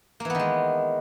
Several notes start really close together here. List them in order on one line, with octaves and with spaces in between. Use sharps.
A#3 E3 B3 D#3 G#3